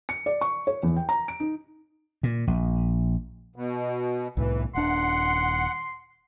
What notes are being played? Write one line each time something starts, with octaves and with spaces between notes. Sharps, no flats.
C#7
D5
C#6
C#5
E2
G5
A#5
D7
D#4
A#2
A#1
B2
C2 A2 E3
D#1 D4 F#5 C6